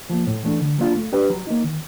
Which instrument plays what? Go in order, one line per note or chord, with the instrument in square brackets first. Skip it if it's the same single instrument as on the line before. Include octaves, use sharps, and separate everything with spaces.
[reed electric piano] F3 A#3
A2
E3 A3 D4
D3
F#3 A#3 D4 F4
A3
D4 G4 B4
F#3
A#3 D#4
D#3